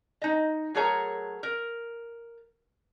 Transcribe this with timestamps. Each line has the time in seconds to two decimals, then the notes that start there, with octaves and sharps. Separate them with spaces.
0.22 D#4 D#5
0.75 F#3 A3 G#4 A#4 C#5 A#5
1.43 A#4